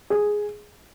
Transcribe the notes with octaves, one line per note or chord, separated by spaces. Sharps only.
G#4